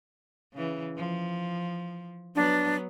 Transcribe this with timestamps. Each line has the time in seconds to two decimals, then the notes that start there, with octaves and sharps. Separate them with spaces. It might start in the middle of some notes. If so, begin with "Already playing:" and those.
0.53 C#3 E3
0.97 F3
2.35 F#3 B3 D4